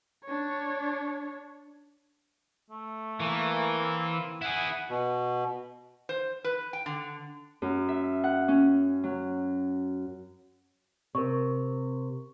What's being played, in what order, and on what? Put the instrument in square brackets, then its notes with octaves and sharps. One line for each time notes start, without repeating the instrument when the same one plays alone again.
[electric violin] D4 C#5
[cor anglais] A3
[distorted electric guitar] E3 [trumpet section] A#3
[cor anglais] C4
[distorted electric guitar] E4 G#4 [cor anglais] F#5
[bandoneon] B2
[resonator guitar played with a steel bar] C5
B4
G5
D3
[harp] F#2
E5
F#5
C#4
F#3
[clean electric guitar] C3 [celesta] A#4 C#6